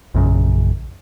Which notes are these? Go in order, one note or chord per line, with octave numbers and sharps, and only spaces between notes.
A#1 F#2 C#3